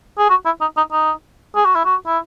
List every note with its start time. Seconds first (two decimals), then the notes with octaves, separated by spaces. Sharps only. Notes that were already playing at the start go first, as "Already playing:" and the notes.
0.18 G#4
0.30 F#4
0.46 E4
0.61 D#4
0.77 D#4
0.92 D#4
1.56 G#4
1.65 F#4
1.75 E4
1.85 F#4
2.07 E4